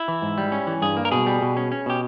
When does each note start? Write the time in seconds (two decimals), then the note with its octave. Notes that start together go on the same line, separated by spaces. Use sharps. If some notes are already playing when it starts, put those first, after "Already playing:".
Already playing: E4
0.08 E3
0.22 G#2
0.38 G3
0.52 C#4
0.67 E3
0.82 G2 G#4
0.97 A#3
1.05 A#4
1.12 B2 G#4
1.26 G3
1.42 B2
1.57 C#4
1.72 C#4
1.86 B2 G4